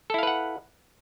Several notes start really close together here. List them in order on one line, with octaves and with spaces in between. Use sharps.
A4 E4 F5 B4 F#5